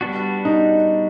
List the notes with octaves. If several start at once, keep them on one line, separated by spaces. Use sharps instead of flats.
G3 B3 D4 F#4
D#4